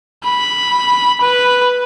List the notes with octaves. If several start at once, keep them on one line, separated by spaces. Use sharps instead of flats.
B5
B4